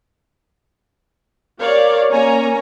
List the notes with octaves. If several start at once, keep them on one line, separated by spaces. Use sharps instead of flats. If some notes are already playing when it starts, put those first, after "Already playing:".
G4 A#4 C#5 D5 F5
A#3 C#4 C#5 G#5 A#5